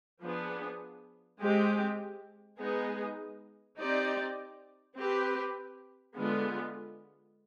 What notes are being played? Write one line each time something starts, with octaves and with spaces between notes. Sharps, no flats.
F3 B3 D4 G#4
G#3 C4 G4
G#3 B3 D#4 G#4
C4 D#4 G4 D5
C4 G4 B4
D3 G#3 B3 F4